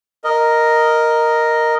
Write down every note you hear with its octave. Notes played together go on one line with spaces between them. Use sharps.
A#4 D#5